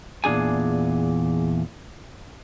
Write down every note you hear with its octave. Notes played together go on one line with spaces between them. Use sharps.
E2 A#2 D4 G#4 G#5